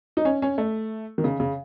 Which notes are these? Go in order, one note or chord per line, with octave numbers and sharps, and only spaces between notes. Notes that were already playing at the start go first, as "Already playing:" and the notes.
D#4
C#4
C#4
A3
D#3
C#3
C#3